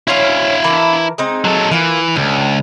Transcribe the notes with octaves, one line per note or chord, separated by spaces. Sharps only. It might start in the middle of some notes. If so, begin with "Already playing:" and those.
C#4 E4 C5 C#5 F5
E3 A#4 A5
G#3 C4 D#4
F#3 A4
E3 A#3 F4
C#2 D4